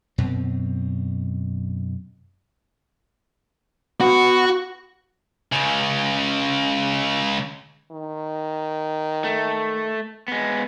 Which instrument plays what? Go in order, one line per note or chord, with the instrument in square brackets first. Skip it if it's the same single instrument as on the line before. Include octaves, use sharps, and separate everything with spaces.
[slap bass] F#2 B2 C4
[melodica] B3 [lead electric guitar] F#4
[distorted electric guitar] C#2 C#3
[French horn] D#3
[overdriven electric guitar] A3
G#3 B3